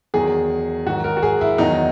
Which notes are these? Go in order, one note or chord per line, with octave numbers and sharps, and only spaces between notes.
E2 D#3 F#3 G#4
G#2 D#3 F#3 F#4
A#4
F#4
G#4
E4
E2 D#3 F#3 D#4